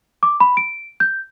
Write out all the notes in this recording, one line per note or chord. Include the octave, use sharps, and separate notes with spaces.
D6
B5
D7
G6